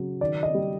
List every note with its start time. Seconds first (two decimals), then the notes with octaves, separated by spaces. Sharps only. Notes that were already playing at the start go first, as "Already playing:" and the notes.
Already playing: C#3 F#3
0.21 D#3 D5
0.43 D#5
0.54 G3